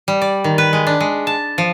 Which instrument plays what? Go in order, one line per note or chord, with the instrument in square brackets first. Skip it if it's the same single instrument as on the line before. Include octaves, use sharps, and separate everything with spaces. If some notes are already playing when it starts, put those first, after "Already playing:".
[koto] G3
D5
D#3
B4
G#3
D4
G#3
A5
F3